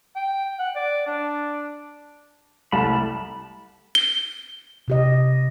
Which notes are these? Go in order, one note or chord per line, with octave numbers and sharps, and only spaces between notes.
G5
F#5
D5
D4
C2 G3 A3 A5 B5
G7
C3 G4 D#5